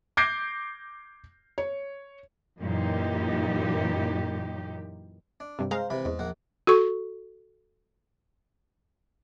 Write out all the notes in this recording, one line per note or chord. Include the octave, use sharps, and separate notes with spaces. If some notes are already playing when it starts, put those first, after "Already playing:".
D6 G6 G#6 A#6 C7 D7
C#5
F#2 A#2 E3 D#4 G4
D4
G2 C3
G#3 C5 F5 A#5
C3 E3 B5
E2 G#2
A#1 A#3 F#5
F#4 A4 C#6